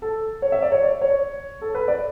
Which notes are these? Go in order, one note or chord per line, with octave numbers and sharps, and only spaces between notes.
A4
C#5
E5
D5
C#5
D5
C#5
A4
B4
D5